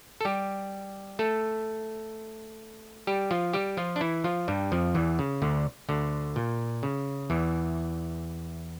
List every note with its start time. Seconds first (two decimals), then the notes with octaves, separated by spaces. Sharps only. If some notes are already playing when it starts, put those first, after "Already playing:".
0.21 A4
0.25 G3 G4
1.19 A3 A4
3.07 G3 G4
3.31 F3 F4
3.53 G3 G4
3.77 F3 F4
3.96 D4
4.01 E3 E4
4.24 F3 F4
4.48 G2 G3
4.72 F2 F3
4.95 E2 E3
5.19 C#3
5.42 D2 D3
5.89 D2 D3
6.36 A#2
6.83 C#3
7.30 E2 E3